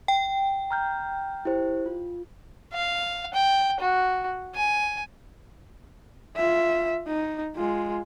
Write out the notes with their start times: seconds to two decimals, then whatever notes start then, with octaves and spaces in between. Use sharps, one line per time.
0.08 G5
0.71 A#5 F6 G6
1.45 E4 G4 C5
1.86 F4
2.73 F5
3.34 G5
3.80 F#4
4.55 G#5
6.36 F4 E5
7.07 D#4
7.56 G#3 F4